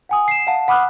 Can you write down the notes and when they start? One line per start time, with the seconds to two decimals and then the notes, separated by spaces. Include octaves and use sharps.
0.09 F#5 G#5 D#6
0.28 C7 E7
0.47 F5 F#5 A5
0.68 F#5 B5 D6 D#6 F6 F#6